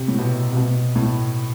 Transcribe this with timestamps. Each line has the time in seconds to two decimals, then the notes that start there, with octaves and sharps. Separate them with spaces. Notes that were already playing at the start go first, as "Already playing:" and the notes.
Already playing: C3
0.08 A2
0.18 B2
0.51 C3
0.57 B2
0.96 A2